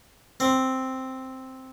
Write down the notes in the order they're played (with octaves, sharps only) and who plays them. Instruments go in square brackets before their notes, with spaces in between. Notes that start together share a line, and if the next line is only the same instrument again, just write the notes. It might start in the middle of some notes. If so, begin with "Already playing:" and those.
[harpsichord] C4